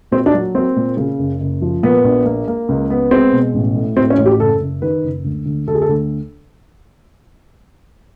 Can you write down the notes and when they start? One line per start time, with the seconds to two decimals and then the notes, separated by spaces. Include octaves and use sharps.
0.11 A#2 C4
0.26 D4
0.34 F#3
0.54 A#3 C4
0.76 A#2
0.97 C#3
1.19 F#1
1.40 F#1
1.62 F3
1.83 A#2 B3
2.04 A#1
2.25 A#3
2.48 A#3
2.69 C#2
2.90 B3
3.11 G#3 C4
3.33 B2
3.54 A1
3.75 A2
3.96 A2 C4
4.10 C#4
4.18 A1
4.26 G4
4.39 F#1 A4
4.60 F#1
4.82 D#3 B4
5.04 F#1
5.24 D2
5.46 D2
5.67 D2 A4
5.75 G#4
5.82 A4
5.89 D2